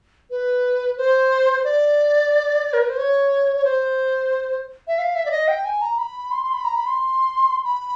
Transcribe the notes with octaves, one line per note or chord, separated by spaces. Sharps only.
B4
C5
D5
A#4
B4
C5
C#5
C#5
C5
E5
F5
E5
D5
D#5
G5
G#5
A#5
B5
C6
C6
B5
A#5
B5
C6
B5